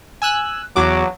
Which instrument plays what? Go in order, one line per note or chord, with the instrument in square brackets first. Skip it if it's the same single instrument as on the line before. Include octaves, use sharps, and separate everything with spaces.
[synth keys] G#5 E6 F#6
[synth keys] E2 F#4 D6 [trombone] F#3